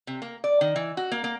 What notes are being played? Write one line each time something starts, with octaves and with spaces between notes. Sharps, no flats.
C3
A#3
D5
D#3
E3
F#4
A#3
A#3